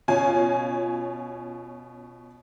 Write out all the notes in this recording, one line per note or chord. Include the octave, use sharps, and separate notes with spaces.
B2 C#4 F4 G#5